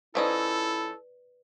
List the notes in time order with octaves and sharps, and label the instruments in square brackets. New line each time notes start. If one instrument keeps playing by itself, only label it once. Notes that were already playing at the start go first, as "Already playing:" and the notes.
[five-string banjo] F3 C#4 D#4 [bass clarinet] E4 [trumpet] A4 [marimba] B4 D5